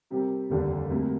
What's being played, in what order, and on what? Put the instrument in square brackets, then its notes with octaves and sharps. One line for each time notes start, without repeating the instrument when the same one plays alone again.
[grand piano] C3 G3 C4 G4 A#4
F1 D#2 D3 G3 D4
D2 C3 G3 A#3